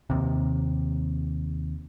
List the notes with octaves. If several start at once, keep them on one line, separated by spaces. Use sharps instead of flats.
D#2 C3